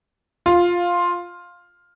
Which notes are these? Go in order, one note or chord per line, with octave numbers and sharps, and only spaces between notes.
F4